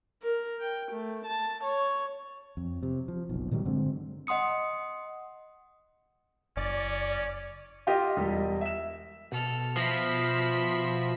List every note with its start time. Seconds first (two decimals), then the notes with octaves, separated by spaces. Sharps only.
0.23 A#4
0.60 G5
0.92 A3
1.26 A5
1.64 C#5
2.57 F2
2.83 C3
3.08 F3
3.29 F#1 B1
3.51 A#2 D#3 F#3 G3
3.65 G2 D3 G#3 C4
4.27 D#5 F#5 C6 D#6 C#7
6.57 F#1 C#4 D5
7.87 F4 G4 D#5
8.17 E1 G3 D#5
8.61 E5 E7
9.32 B2 A4 F6
9.77 F3 E5 B5 A#6 C7